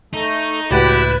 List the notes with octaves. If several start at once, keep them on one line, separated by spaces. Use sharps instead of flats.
A3 D#4
C#2 A2 E4 F#4 G4 B4 A6